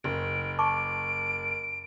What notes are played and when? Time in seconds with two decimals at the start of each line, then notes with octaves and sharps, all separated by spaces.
0.04 F#1 D7
0.59 A5 C#6 D6 D7